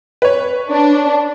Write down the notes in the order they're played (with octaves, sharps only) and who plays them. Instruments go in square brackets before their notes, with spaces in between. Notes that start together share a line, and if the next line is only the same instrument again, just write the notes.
[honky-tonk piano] B4 C#5
[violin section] D4